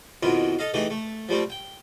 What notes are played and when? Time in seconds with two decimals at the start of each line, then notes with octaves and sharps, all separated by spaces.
0.23 F2 B2 D#3 E4 F4
0.59 A4 D#5 F5
0.74 E3 A3 D#4 G4 G#4
0.90 A3
1.29 F3 G3 A3 C4
1.50 G5